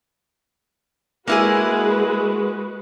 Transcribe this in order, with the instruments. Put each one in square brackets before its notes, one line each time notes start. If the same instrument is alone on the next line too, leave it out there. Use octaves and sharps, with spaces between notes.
[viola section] G#3 F#4 B4 [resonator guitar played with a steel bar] A#3 E4 G#4